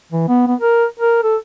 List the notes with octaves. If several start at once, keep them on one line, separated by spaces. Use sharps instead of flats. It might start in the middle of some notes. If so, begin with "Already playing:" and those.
E3
B3
B3
A#4
A#4
A4